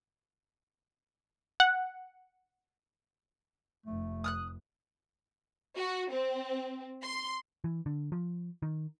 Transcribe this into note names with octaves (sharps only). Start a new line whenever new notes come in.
F#5
F1 A3
D#6 F6 F#6
F#4
C4
C6
E3
D3
F3
D#3